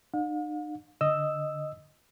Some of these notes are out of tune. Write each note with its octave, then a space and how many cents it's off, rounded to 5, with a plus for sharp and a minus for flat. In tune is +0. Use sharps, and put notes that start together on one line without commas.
D#4 -45 F5 +45
D3 -10 D#5 +0 E6 +0